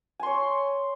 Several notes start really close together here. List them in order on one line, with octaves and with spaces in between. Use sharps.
G#5 C6 C#5